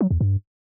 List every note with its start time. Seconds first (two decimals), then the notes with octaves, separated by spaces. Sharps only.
0.01 F#3
0.11 E2
0.21 G2